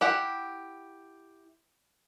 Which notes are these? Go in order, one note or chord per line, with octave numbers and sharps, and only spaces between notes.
E4 G4 F#5